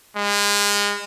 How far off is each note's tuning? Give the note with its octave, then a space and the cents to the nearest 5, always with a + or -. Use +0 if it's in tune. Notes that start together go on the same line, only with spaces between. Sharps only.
G#3 -30